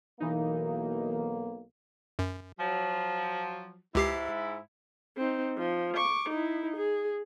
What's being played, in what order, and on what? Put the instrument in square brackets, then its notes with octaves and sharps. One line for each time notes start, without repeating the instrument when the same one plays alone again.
[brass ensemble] B1 B2 A#3 [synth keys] E3 D#4
[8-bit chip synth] F#2
[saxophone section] F3 F#3
[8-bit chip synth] C#2 G4 C7 [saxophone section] G#2 E4
[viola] C4 D#4
F3
C#6 D6
D#4 E4
G#4